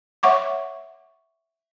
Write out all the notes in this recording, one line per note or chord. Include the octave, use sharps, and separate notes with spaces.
C#5 E5 F#5 C#6 D6